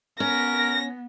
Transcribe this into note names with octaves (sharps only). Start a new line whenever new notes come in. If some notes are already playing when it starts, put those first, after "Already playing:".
B3 C#4 A#4 A#6